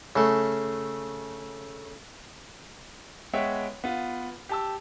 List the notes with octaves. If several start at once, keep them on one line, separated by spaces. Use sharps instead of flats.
C#3 A3
G#3 B3 C#5 E5 G5
B3 F4
G4 A5 E6